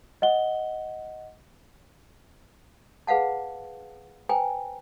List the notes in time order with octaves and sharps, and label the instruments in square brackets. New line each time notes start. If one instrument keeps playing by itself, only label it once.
[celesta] D#5 F#5 G7
[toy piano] G#4 B4 F5 F#5 A5
B4 C5 G5 G#5 A#5